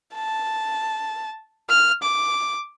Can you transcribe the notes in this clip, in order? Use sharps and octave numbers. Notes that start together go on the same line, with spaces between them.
A5
F6
D6